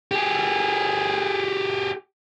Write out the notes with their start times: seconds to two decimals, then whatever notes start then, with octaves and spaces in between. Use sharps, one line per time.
0.11 G4 G#4